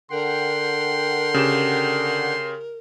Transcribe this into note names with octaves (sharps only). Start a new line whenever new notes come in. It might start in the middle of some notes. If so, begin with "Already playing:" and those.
D3 A#4 F#5 G5 C6
C#3 G4 E7